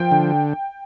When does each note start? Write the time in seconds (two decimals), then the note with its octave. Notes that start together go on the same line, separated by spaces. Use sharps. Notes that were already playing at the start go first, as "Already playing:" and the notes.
Already playing: F3 G5
0.11 D3